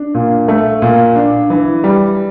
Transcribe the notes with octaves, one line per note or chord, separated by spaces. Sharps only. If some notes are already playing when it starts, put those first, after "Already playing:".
Already playing: D4
A#2
A3
A#2
D4
E3
G3